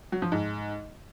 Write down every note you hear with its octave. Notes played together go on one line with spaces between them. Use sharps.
F#3
F3
G#2